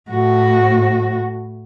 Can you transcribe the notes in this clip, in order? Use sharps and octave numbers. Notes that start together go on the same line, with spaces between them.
A2 F#4